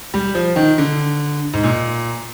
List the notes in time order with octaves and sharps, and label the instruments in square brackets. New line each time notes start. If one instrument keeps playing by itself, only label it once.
[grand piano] G3
F3
D#3
D3
G#2
A#2